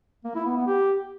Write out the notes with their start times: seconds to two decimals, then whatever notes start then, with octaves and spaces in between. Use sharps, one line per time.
0.25 A#3
0.35 E4
0.46 B3
0.56 B3
0.67 G4